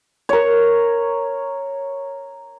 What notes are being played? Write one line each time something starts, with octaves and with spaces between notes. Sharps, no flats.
A#4 C#5